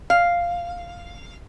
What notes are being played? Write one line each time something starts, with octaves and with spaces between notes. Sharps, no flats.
F5